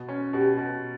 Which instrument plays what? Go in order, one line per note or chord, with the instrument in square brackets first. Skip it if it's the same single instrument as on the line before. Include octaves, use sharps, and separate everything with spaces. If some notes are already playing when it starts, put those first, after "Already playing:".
Already playing: [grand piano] B2
C#4
[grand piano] B2 [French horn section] G4
[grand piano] B2